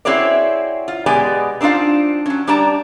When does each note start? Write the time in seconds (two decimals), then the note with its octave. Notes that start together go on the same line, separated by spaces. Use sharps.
0.05 C4 E4 F#4 G#4 C#5 D5
0.88 F4
1.06 B2 G#3 B3 G4 D5 G#5
1.61 C4 D4 D#4 F4 F5
2.26 F#3 C#4
2.47 G3 D4 G4 D5 A5 A#5